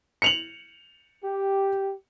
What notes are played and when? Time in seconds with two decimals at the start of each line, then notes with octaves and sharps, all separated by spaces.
0.22 C#7 F7 F#7
1.24 G4